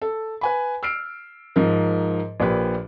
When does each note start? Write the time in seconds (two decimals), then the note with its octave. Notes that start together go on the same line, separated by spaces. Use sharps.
0.02 A4
0.41 B4 G#5 B5
0.83 E6 F6 C7 D7
1.56 G#2 F3 A#4
2.40 A#1 A#2 G4 B4